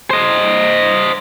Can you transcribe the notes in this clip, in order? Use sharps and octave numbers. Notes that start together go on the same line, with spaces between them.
C5 D#5